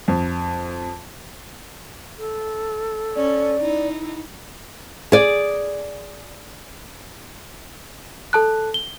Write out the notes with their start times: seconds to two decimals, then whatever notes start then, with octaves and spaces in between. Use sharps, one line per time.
0.08 F2
2.18 A4
3.16 C#4 D5
3.62 D#4 E4
5.12 G#4 D5
8.33 A4 A5 F#6
8.74 G7